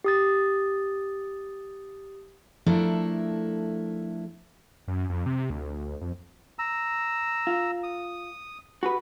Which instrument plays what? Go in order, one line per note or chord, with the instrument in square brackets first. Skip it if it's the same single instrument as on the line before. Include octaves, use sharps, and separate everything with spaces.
[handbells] G4 D#6 A6
[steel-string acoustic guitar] F3 A3 D4 E4 A4 A#4
[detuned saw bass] F#2
F2
C3
D2
F2
[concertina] A#5 E6
[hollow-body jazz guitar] F4
[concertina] D#6
[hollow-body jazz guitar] F#4 G4 B4